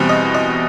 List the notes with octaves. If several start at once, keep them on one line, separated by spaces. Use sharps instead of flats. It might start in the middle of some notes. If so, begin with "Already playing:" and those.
Already playing: E2 B2 G3 C4
D#5
D#5